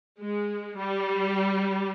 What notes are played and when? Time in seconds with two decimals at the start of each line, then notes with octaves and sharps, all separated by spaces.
0.22 G#3
0.76 G3